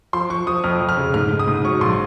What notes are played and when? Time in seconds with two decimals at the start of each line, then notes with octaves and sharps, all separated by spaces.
0.13 F3 C6
0.30 F3 C#6
0.47 F3 D#6
0.64 F2 F6
0.80 F2
0.89 F6
0.97 C#3
1.14 G#2 F6
1.31 G#2
1.39 D#6
1.48 G#2
1.64 F#3 C#6
1.81 A#1 C6